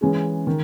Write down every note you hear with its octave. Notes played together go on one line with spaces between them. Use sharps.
E3 G#3 C#4 G#4
D#3